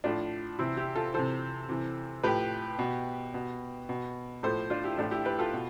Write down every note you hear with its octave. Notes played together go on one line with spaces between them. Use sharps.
A2 F3 D4 F4
C3 E3 C4 E4
E4 G4
F4 A4
C3 E3 A4 C5
C3 E3
A2 F3 G4 B4
B2
B2
B2
A2 F3 A4 C5
D4 F4
E4 G4
A2 E3 D4 F4
E4 G4
G4 B4
F4 A4
B2